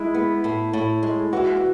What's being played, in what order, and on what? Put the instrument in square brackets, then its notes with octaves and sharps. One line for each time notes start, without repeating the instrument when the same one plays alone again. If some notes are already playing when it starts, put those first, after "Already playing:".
Already playing: [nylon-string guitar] G#3 [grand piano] E4
[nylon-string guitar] B3
A2
A2
G#3
[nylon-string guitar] E3 [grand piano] F#4
[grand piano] F#4